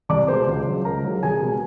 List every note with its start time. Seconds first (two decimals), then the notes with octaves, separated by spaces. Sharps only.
0.09 C2 D5 D6
0.28 B2 G#3 C5 C6
0.47 C#2
0.67 C#3 F#3
0.85 C#2 A#4 A#5
1.04 C#3 F#3
1.23 C2 G#4 G#5
1.42 B2 G#3